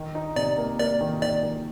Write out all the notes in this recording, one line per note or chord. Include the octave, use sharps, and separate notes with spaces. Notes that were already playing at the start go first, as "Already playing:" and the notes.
Already playing: D#3
D#4
C3 D5
A#3
A#3 D5
D#3
D#3 D5
D#3